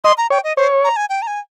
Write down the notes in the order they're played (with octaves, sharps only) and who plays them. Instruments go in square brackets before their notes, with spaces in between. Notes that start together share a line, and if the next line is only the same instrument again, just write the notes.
[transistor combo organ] D#5 [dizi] C6
[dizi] A#5
[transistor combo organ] C#5 [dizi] G5
[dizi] D#5
[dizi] C5 [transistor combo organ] C#5
[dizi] A#5
G#5
G5
A#5
G#5